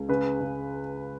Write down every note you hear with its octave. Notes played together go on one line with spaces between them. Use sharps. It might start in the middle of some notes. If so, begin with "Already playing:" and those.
Already playing: C#2
C#3 B4
C#3